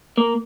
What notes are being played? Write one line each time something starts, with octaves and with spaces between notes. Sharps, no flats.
A#3